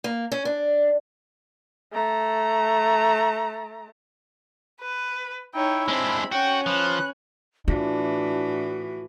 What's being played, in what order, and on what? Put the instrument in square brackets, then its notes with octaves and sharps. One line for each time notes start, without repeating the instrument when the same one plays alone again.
[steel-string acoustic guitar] A#3
C#4
D4
[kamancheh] A3 A#5
[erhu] B4
[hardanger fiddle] D#4 C#5 [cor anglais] E4 [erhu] G5
[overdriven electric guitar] G#3 D4 [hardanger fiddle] C4 [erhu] B5
[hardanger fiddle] C#4 [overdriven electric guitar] F#4 [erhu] G5
[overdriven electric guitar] F3 [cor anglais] B4 [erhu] F#6
[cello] A2 E3 [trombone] D4 [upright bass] F4 [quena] F#4